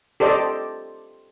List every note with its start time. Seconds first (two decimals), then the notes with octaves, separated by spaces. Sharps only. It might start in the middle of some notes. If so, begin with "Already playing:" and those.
0.20 G4 A4 C5 D5 D#5